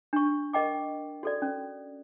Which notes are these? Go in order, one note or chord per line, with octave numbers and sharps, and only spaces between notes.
D4 C#6
A#4 D#5 G5 D6
F#4 A4 D5
C#4